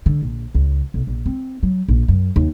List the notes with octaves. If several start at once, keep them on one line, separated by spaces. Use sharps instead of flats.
D3
A#1
C#2
B1
A#1
C4
F#3
A#1
F#2
D#2